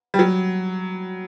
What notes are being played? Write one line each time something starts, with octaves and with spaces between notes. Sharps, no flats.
G3
F#3